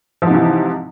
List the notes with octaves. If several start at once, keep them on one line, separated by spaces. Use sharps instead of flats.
G#2 C3 E3 F3